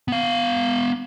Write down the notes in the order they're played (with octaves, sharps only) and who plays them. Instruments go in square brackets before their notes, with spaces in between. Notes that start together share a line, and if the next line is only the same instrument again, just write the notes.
[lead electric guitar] B3 F5